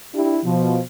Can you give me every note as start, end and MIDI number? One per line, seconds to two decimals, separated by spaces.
0.14 0.39 62
0.14 0.39 64
0.14 0.39 67
0.44 0.80 47
0.44 0.80 53